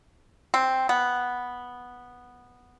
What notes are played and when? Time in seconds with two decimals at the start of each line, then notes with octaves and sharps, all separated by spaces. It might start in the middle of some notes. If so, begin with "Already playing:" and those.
0.54 C4
0.89 B3